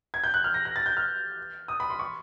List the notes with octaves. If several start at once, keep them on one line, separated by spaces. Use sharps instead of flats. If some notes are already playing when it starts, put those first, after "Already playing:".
G#6
G6
F#6
F6
A#6
A#6
A6
G6
F6
D#6
B5
C6
C#6